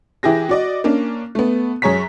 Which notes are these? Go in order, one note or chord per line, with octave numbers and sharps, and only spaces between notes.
E3 E4 G4 G#4 A#6
F#4 D5 D#5
A#3 C#4 D4
A3 B3
F#2 G#4 C#5 A#5 B6